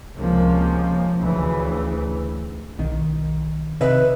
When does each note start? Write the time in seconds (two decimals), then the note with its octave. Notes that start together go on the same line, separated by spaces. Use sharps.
0.17 C#2 C3 F3 A#3 C#4
1.20 D2 C#3 E3
2.79 B1 D#3
3.81 C3 D#4 B4 D#5 E5